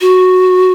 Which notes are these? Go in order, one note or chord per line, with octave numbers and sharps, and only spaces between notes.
F#4